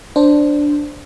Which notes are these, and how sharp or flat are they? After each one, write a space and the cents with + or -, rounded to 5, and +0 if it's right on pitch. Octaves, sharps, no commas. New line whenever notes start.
D4 +0 C5 +0